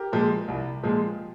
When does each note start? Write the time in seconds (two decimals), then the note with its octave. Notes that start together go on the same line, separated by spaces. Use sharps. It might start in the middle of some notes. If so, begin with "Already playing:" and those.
Already playing: G4 A#4
0.12 A#2 F3 G#3
0.48 C2
0.83 A#2 F3 G#3